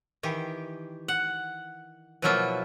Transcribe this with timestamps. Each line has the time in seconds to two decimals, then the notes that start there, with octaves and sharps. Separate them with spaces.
0.23 D#3 E3 G4
1.08 F#5
2.22 B2 F3 F#3 A#3 E4 F4